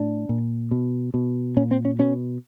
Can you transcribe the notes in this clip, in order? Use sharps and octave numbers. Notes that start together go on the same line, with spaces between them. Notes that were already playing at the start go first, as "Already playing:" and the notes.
Already playing: A2 D4
A#2
B2
B2
A#2 C#4
C4
C#4
B2 C#4